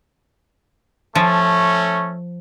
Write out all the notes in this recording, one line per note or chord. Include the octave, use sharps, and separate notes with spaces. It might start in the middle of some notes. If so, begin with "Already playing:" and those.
F3 A3 C#4